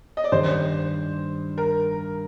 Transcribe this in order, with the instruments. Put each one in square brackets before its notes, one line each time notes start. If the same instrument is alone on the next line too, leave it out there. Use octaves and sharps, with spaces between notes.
[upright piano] D#5
D5
[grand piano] G2 D#3 G3 [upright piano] C5
[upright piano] A#4